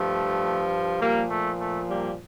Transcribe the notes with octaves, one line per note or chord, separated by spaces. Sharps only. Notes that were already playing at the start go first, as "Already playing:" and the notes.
Already playing: G2 F3 A3
A#2 F3 G3 A#3
A3
A3
G3 A#3